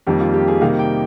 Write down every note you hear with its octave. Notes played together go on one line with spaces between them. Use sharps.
F2 D#3 G3 A#3 G4
F4
G4
G#4
C3 D#3 G3 A#3 F5
G5